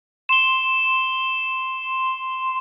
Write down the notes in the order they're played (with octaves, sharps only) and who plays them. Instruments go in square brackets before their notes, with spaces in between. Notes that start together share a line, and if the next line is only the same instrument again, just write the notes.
[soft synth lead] C6 [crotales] E7 G7